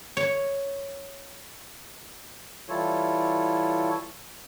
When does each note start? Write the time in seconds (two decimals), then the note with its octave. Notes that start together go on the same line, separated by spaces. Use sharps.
0.17 C#5
2.69 E3 G3 E4 F4 A4 C#5